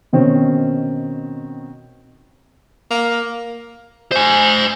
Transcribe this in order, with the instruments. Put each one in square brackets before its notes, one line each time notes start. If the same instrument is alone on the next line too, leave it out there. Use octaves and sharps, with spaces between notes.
[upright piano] B2 D#3 C4 C#4
[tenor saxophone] A#3
[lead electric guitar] C5 G#5